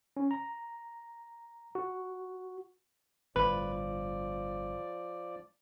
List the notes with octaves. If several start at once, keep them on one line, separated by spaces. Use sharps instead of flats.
C#4
A#5
F#4
G1 A2 F3 B4 D5